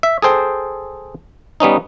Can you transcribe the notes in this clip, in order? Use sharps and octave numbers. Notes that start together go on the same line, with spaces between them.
E5
G#4 A4 C5 G5
G3 B3 C#4 D#4